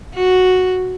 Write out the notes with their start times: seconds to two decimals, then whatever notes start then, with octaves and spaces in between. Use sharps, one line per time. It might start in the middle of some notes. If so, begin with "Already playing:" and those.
0.14 F#4